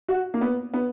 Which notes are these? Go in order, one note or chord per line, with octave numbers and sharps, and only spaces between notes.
F#4
A#3
B3
B3